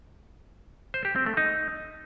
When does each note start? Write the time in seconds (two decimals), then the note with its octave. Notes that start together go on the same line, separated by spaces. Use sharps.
0.94 C5
1.05 G4
1.16 C4
1.26 A3
1.37 D#4